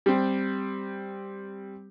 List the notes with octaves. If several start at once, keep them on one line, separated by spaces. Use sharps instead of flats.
G3 C4